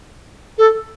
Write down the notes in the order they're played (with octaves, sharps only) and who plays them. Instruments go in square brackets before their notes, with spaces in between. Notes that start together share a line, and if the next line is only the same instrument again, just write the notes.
[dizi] A4